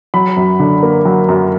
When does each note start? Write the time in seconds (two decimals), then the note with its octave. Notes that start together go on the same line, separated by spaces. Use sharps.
0.14 F#3 B5
0.37 F#2
0.60 D3
0.83 A#3
1.05 F#3
1.29 F#2